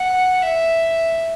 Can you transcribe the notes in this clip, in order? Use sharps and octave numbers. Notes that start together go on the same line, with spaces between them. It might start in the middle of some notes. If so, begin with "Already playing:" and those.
Already playing: F#5
E5